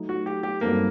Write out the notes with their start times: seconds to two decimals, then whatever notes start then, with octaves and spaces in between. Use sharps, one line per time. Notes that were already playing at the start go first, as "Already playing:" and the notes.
Already playing: F#3 A3 D#4
0.09 F#4
0.26 G4
0.43 G4
0.61 G2 F#3 A#3 C4 D#4 A4